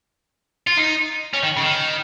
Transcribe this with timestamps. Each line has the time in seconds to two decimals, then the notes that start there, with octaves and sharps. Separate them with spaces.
0.67 F4
0.77 D#4
1.34 C#4
1.43 D#3
1.57 C#3
1.61 D#3